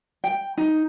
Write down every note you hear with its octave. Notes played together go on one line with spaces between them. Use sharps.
G5
D#4